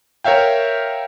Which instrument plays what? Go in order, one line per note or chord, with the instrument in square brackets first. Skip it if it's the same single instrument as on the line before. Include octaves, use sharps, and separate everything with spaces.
[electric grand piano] A#4 C#5 E5 F5 G5